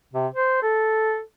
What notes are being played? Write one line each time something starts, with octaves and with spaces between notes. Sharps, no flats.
C3
C5
A4